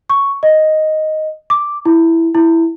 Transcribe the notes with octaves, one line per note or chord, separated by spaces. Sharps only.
C#6
D#5
D6
E4
E4